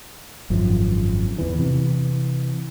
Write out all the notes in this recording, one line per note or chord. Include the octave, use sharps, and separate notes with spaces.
G#1 F#2 F3
E2 E3
C3 E3